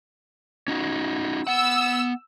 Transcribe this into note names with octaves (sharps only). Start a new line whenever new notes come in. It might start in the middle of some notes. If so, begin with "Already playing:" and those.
C#4 D#4 F#4
B3 F#5 E6